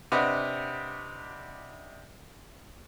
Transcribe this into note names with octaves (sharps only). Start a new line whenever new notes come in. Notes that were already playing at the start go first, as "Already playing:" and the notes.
C3 D4 B4 D#5 F#5